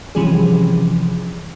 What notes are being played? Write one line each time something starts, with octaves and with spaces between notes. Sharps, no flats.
C3 E3 F3 G3 C#4 G#4